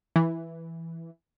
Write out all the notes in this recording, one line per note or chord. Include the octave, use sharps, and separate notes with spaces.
E3